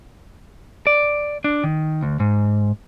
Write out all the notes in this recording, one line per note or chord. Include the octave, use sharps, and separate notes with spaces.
D5
D4
D#3
D2
G#2